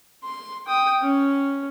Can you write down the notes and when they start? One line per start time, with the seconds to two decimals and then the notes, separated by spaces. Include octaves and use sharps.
0.24 C6
0.67 G5 D#6
1.02 C#4